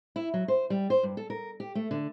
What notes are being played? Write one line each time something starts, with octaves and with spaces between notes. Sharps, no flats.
E4
F#3
C5
G3
C5
G2
A4
A#4
G4
A3
D3